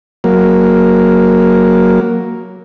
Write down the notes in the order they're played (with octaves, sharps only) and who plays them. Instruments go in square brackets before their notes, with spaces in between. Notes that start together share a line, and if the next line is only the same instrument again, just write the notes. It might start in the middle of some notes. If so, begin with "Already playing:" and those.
[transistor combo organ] F#3 A#3